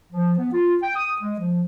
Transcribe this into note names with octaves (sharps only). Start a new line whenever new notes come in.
F3
B3
F4
G5
D#6
G#3
F3